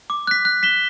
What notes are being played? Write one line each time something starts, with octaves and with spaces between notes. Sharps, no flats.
D6
F#6 B6
F#6
B6 E7 G7